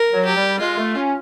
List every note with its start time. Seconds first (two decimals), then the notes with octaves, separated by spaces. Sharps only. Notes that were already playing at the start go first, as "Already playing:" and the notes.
Already playing: A#4
0.13 F#3
0.24 G4
0.36 G3
0.59 G#3 F4
0.77 A3
0.95 C#4